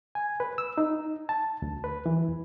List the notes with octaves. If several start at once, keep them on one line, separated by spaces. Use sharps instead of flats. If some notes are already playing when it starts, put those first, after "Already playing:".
G#5
B4
E6
D#4
A5
D2
B4
E3
E2